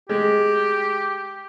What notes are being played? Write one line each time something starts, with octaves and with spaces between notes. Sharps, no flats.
G#3 G4